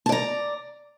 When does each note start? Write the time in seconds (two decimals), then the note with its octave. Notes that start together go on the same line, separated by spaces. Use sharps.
0.06 A5
0.09 D5
0.12 A#5